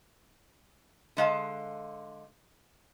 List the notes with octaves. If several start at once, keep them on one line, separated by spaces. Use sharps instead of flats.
D3 G#3 F5 A5